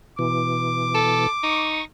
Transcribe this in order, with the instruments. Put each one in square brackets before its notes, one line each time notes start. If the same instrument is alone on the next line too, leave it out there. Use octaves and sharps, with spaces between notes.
[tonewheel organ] B2 E3 [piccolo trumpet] D6
[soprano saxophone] A4
[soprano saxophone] D#4 [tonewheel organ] C#6